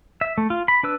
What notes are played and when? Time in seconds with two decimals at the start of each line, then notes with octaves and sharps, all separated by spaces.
0.21 E5
0.38 A3
0.50 F4
0.68 B5
0.83 D4 B4 E6